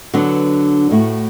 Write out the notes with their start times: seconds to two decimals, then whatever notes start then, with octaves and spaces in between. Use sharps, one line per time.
0.14 D3 F#3 B3 D4
0.91 A2 A3 F#4